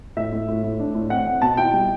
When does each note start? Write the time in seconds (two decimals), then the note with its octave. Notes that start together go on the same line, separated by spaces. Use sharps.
0.17 A2 E5
0.32 A2
0.48 A2
0.64 A2
0.79 D4
0.95 A2
1.10 C4 F#5
1.27 C4
1.42 B2 A5
1.57 E4 G5
1.73 G3